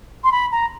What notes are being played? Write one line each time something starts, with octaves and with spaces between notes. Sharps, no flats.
C6
B5
A#5